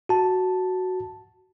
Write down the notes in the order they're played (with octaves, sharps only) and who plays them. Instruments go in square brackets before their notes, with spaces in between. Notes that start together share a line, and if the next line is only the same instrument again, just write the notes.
[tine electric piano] F#4 A5